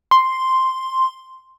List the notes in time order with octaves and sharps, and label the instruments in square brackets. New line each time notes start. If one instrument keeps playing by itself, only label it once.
[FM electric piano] C6